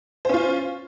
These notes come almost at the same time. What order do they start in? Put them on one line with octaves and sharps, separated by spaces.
C5 C#4 F4